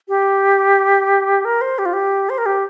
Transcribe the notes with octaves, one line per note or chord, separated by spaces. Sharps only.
G4
A#4
C5
G4
F4
G4
C5
A#4
G4